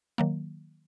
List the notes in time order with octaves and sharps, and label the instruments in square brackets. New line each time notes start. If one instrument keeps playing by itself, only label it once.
[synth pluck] D#3 F#3 A#3